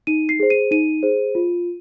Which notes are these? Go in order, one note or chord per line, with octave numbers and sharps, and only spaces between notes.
D#4 D#7
C7
G#4 C5
D#7
D#4 D#7
G#4 C5
F4